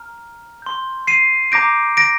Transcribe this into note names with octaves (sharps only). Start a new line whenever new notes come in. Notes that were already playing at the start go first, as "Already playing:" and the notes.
Already playing: A#5 F6
C6 G6
C7 D#7
A#5 D6 G6 A#6 D7
A#6 D7